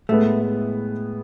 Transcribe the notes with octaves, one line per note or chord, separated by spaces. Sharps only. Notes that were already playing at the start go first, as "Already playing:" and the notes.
A2 G#3 A3 B3